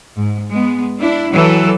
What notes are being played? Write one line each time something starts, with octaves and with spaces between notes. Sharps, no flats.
G#2
G#3 B3
D4 E4
E3 F#3 A4